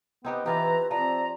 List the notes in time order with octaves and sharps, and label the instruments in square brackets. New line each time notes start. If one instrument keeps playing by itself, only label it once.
[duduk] B3 [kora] C4 D#4 G4
[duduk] E3 [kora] E4 F4 G4 [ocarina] B4 [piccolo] A#5
[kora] F3 [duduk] C4 [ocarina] D5 [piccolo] A#5